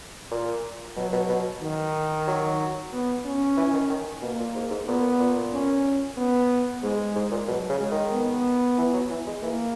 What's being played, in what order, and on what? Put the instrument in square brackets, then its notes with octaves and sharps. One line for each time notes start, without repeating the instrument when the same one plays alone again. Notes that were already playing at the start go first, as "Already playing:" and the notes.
[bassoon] A#2
[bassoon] B2 [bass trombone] F#3
[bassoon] B2
B2
[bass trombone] D#3
[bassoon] F#3
[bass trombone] B3
C#4
[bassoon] E3
D#3
D#3
[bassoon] B2 [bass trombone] A#3
[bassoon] A#2
G#2
G#2
[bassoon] A#2 [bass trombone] B3
[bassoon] A#2
[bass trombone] C#4
B3
[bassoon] G#2 [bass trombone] G#3
[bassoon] G#2
A#2
[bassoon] B2 [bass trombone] F#3
[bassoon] C#3
[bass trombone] G#3
[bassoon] D#3
[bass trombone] B3
[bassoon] E3
F#3
E3
G#3
[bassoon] E3 [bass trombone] A#3